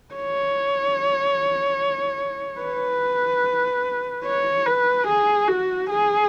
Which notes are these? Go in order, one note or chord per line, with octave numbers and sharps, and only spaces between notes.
C#5
B4
C#5
B4
G#4
F#4
G#4